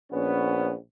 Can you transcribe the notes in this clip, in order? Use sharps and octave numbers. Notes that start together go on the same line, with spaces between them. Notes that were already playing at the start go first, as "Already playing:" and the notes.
A#1 B3 C#4